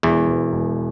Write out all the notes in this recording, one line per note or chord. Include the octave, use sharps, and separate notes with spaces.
E1 E2 E3
E1
E1